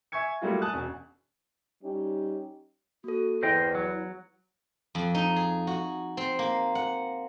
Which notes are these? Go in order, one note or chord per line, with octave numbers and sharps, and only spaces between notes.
E5 G#5 C#6 G#6 C#7
F#3 G3 A3 A#3 E4 F4
G#5 A5 D#6 F#6
E1 C#4
G3 C#4 D#4 G4
A#3 F#4 A4
E2 E4 B4 C5 D#5 G5
F#3
F2
D#4
G#4
F#4
C4
A#3
F#5